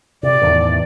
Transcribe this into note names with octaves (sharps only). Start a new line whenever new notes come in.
C3 D5
E2 A2 D#3